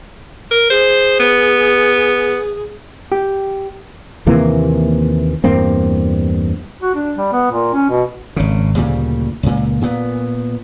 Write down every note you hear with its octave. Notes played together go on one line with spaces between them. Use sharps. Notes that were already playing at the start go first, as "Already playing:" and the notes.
A#4
G#4 C5
B3
G4
D#2 C3 E3 A#3
E2 G2 A#3 C4
F#4
D4
G3
B3
A#2
C#4
B2
G#1 C#3
D2 A#2 C#3 G3
C#2 A#2
A#2 B3